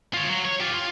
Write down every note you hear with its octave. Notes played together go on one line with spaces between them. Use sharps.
F4 C#5
F#3
C#5
F4 G4
F4